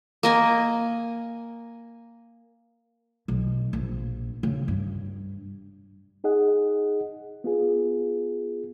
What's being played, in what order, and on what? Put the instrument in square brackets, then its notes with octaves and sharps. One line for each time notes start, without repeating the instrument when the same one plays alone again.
[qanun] A#3 D#5 G#5
[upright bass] B1
A#1
C#3
G2
[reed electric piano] D#4 G#4 D#5 F#5
B3 F4 G#4